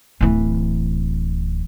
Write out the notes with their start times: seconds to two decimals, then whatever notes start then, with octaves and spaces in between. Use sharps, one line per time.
0.21 D1 E3